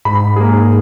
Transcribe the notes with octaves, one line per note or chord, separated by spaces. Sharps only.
G#2 B5
A#3 G#4